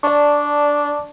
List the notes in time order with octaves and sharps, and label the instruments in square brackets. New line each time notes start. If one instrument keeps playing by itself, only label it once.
[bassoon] D4 [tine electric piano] D5 A5 C#6